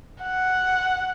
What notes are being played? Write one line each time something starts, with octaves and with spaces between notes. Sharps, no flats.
F#5